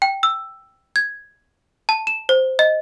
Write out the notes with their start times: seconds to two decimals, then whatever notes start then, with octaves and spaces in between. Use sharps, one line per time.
0.02 G5
0.23 E6
0.96 G#6
1.89 A5
2.07 E7
2.29 C5
2.59 D#5